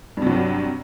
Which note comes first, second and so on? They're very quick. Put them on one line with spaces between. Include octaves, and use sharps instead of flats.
G2 C3 F#3